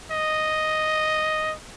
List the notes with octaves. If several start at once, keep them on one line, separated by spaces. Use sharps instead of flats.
D#5